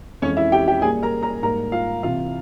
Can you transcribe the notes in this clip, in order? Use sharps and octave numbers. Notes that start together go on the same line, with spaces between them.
F2 E3 G#3 C#4 C#5
E4 E5
G4 G5
G4 G5
A#2 G3 A#3 G#4 G#5
A#4 A#5
A#4 A#5
G#2 G3 A#3 A#4 A#5
F4 F5
C2 C3 E3 F4 F5